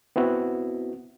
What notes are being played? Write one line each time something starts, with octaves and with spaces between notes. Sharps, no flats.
B3 C4 E4 F#4